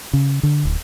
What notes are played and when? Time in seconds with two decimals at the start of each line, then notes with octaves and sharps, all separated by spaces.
0.13 C#3
0.43 D3
0.65 D1